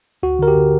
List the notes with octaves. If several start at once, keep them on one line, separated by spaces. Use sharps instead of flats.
D2 F#4
D3 A#4
G4
D3